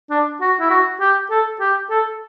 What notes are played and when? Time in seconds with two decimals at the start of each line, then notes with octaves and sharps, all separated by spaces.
0.10 D4
0.41 F#4
0.60 E4
0.70 F#4
1.00 G4
1.30 A4
1.60 G4
1.90 A4